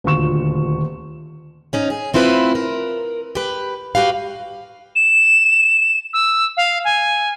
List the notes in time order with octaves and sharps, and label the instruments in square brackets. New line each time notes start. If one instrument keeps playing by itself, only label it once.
[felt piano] D#1 D2 F4 C#6 E7
[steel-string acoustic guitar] G#2 C#4 D#4
G#4
A3 C4 E4 F4 B4
A#4
G4 B4
F#4 G4 B4 F5
[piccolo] E7
E6
F5
G#5